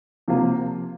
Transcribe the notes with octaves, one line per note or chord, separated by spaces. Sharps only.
C3 F3 A#3 F4